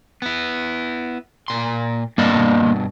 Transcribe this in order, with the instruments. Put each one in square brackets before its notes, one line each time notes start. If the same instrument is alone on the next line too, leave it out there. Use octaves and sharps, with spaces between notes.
[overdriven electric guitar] B3 E4
A#2 C6
[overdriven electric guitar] G2 B2 [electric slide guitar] A#3 D5 D#5